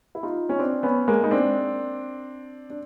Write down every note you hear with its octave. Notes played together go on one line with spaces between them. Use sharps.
E4
D#4 F4
C#4
C4 D4
B3 C#4
G#3 A#3
D#4
C4 D4
D4